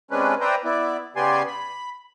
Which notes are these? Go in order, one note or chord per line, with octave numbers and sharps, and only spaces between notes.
C3 G#3 C#4 D4 B4
B4 C5 D5 E5 G5 A#5
B3 E4 D5
C#3 B3 G4 D5 G#5 C6
B5